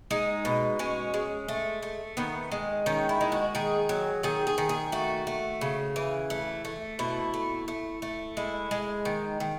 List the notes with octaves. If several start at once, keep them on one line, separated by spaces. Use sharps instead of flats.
G#3 D#4
B2
G#3 C#4
G#3
A3
A3
D#3 B3
G#3
D#3 C#4
E4
G#3
F#4
D#3 G#4
F#3
D#3 G#4
G#4
D#3
G#4
A3 F#4
A3
C#3
E3
A3
A3
B2 E4
A3
A3
A3
G#3 E4
G#3
D#3
D#3